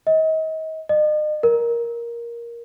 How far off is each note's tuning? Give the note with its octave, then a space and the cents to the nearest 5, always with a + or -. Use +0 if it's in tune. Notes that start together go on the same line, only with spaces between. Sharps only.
D#5 +35
D#5 -40
A#4 +10